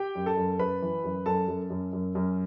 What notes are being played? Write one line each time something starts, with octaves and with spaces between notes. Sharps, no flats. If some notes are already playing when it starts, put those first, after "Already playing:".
Already playing: G4 G5
F#2
A4 A5
F#2
F#2 B4 B5
E3
F#2
F#2 A4 A5
F#2
F#2
F#2
F#2